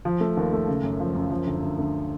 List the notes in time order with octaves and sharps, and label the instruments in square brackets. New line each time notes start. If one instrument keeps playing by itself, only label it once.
[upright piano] F3
A3
D#2
A3
C#3
F#2
F3
F#2
F3
D2
D2
D2